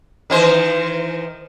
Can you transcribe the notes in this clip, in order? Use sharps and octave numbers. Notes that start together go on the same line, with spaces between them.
D#3 E3 C5